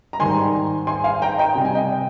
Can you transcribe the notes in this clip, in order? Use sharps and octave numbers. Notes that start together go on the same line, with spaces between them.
A#5
G#2 D#3 G3 G#5 C6
G#5 C6
F5 G#5
G5 A#5
D#5 G5
C3 G3 G5
G#5
D#5 G5